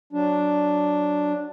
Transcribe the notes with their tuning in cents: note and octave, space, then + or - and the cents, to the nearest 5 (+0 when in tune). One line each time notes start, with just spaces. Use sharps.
F#3 +0 D4 +0